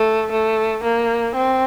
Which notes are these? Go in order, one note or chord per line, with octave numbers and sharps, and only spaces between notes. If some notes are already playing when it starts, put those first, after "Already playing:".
Already playing: A3
A3
A#3
C4